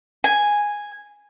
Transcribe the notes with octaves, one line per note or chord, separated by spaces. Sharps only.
G#5